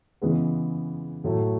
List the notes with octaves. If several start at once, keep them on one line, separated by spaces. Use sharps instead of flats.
C#3 E3 G#3 B3
A2 F#3 A3